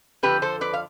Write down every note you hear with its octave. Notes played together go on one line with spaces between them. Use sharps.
F2 D3 F3 G4 B4
A4 C5
B4 D5
F5